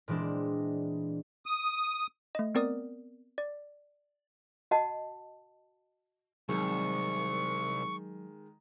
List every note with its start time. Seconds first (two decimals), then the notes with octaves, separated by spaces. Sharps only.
0.08 A#2 E3 G#3 C4 D4
1.46 D#6
2.35 A3 D#5
2.55 B3 C4 A#4 D5 D#6
3.38 D5
4.71 F#4 D#5 F#5 A5
6.49 C2 D#3 F#3 G#3 C#6